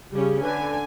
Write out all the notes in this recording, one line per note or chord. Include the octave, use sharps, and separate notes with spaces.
C#3 G3 C#4 G4
D3 B4 G#5